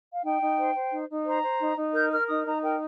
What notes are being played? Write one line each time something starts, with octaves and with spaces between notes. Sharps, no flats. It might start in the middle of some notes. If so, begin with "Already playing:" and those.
F5
D#4 G5
D#4
C5
C5
D#4
D#4
C5 A#5
C5
D#4
D#4
A#4 G6
A#4 F6
D#4 D#6
D#4 A#5
A#4 G5